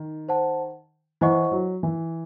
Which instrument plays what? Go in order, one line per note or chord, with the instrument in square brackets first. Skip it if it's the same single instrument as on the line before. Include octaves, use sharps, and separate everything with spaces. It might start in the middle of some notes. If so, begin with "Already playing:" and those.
Already playing: [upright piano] D#3
[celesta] C5 F#5 A5
[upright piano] E3 [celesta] E4 C5 D#5 F#5 C#6
[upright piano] F#3
E3